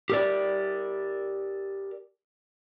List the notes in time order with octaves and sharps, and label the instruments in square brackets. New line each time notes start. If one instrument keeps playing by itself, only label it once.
[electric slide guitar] G4 A#4 D5